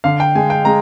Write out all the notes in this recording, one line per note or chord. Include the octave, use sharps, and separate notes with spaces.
D3 F5
G5
G#3 G#5
G5
G#3 A#5